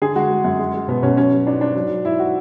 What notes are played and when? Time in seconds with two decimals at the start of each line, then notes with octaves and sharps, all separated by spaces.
0.02 D3 G#4
0.16 G#3 F#4
0.31 G#3
0.44 F#2
0.59 G#3
0.74 G#3
0.88 B2 B3
1.02 B2 C#4
1.17 F#3 C#4
1.32 F#3
1.47 G#2 D4
1.61 G#2 D4
1.75 F#3
1.90 F#3
2.05 G#2 E4
2.19 F#4